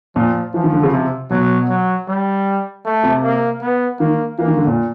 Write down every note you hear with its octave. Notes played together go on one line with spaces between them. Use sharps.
A#2 F3
E3 F3
D#3
D3
C#3
C3
B2 F#3
F#3
G3
A3
C3
A#3
B3
D#3 A#3
E3 A#3
D#3
D3
A#2